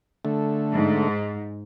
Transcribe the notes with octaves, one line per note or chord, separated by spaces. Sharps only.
D3 A3
G#2